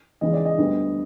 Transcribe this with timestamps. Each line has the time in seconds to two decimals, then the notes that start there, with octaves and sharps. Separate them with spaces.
0.21 E2 C#3 E3 G#3 D#5
0.33 D5
0.45 D#5
0.58 D2 D3 G3 B3